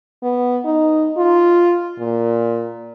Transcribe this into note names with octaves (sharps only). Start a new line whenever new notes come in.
B3
D#4
F4
A#2